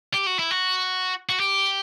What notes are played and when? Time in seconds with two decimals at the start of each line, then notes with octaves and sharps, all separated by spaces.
0.14 G4
0.26 F#4
0.39 E4
0.51 F#4
1.29 F#4
1.40 G4